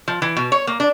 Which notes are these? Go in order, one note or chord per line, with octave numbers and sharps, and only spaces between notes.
F3
E3
B2
C#5
A#3
D4